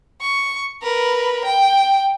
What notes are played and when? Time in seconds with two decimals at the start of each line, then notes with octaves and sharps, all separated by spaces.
0.21 C#6
0.82 A#4 B4
1.45 G5